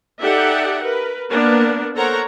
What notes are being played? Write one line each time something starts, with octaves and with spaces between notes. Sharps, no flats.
D#4 G4 A4 D5 E5 F#5
A#4 B4
A#3 B3 D4 A#4
A4 A#4 C5 C#5 F#5 A#5